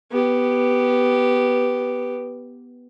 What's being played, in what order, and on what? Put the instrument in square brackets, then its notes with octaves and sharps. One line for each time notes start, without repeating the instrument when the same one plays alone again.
[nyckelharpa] B3 G4